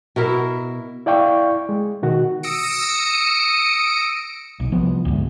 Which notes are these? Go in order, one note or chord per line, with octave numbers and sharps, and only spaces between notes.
B2 E4 A#4 E5
E4 D5 F5 G5 C#6
G#3
B2 D#3 F#4
D#6 E6 A#6 C#7 D7
B1
C2 F3 B3
D2 G#2